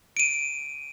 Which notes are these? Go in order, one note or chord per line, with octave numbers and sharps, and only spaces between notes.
D7 D#7